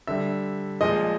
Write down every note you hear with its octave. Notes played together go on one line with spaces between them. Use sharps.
D3 G3 E5
A#2 F3 G#3 D#5